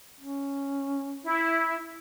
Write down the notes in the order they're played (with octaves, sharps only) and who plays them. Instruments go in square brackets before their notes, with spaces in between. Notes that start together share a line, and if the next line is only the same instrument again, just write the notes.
[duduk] C#4
[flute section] E4